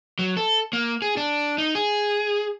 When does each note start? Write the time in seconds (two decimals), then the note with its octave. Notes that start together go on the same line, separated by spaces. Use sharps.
0.19 F#3
0.37 A4
0.73 A#3
1.02 G#4
1.17 D4
1.58 D#4
1.75 G#4